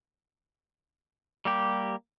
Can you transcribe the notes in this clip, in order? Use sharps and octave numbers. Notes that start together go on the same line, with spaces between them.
G3 A#3 G4